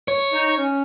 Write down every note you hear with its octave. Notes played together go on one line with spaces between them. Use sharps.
C#5
D#4
C#4